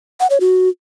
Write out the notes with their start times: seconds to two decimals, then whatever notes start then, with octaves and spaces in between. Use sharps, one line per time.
0.20 F#5
0.30 C#5
0.40 F#4